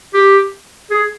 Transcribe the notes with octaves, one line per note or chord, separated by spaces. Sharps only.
G4
G#4